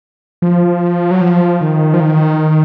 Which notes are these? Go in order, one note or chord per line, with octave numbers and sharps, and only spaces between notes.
F3
F#3
F3
D#3
F3
D#3